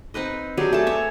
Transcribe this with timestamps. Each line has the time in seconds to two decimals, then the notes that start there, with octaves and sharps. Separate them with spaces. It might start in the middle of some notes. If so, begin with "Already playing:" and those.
0.14 C4 D#4 B4 D#5
0.57 F#3 D4 G4 G#4
0.73 A3 G#4 A5
0.87 C#5 E5